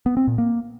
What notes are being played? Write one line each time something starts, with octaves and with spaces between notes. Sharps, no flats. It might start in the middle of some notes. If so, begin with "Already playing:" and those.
B3
C4
A#2
A#3